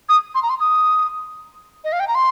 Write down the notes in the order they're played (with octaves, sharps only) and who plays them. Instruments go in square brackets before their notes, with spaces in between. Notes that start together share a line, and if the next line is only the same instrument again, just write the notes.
[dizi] D#6
C6
A#5
C6
D#6
D#5
F5
G5
A#5
C6